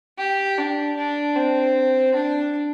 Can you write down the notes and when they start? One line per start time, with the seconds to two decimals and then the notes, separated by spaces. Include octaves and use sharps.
0.18 G4
0.58 D4
0.97 D4
1.35 C4
2.14 D4